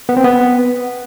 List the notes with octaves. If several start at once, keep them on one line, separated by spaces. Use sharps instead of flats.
B3
C4
B3